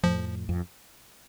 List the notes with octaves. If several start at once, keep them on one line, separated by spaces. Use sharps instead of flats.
F2 A2 F3
F2